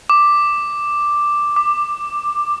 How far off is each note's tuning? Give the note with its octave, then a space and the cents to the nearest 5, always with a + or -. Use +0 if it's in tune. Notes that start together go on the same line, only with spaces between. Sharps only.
D6 +5
D6 +15